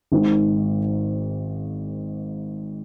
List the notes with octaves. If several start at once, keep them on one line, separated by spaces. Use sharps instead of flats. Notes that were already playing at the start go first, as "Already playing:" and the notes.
G#1 G#2 D#3